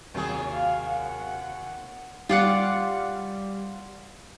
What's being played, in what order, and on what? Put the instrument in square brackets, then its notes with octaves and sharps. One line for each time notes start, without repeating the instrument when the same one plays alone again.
[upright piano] D#2 C3 [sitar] F#3 F4 G#4
[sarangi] F5
F#5
[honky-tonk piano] G3 [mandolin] F4 D5 F#5